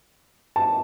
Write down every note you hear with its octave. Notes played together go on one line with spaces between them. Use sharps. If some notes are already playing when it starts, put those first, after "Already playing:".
A5